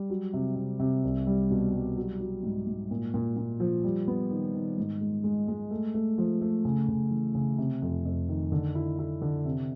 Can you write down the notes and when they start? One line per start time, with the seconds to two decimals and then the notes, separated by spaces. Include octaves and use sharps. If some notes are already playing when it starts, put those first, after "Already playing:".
Already playing: G3
0.10 F#3
0.33 C3
0.56 C3
0.80 C3
1.04 C2
1.27 G3
1.51 B2
1.73 G3
1.97 F#3
2.21 F#3
2.43 G#2
2.66 G#2
2.91 A#2
3.14 A#2
3.36 A#2
3.60 F3
3.84 G3
4.07 B3
4.31 D#3
4.55 D#3
4.78 G#2
5.01 G#3
5.24 G#3
5.48 G#3
5.71 A3
5.94 A3
6.18 F3
6.41 A3
6.65 C#3
6.88 C#3
7.11 E3
7.35 C#3
7.58 C3
7.82 F2
8.05 F2
8.29 D#3
8.52 D3
8.75 E4
8.99 E4
9.22 D3
9.45 C3